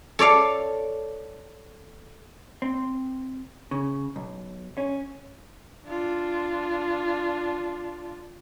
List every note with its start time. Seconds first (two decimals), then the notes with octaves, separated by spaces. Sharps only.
0.19 A4 C#5 D5 F5
2.62 C4
3.71 C#3
4.16 B1
4.78 C#4
5.87 D4 F4